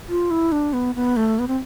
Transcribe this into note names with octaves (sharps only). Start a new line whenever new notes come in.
F4
E4
D4
B3
B3
A3
B3
C4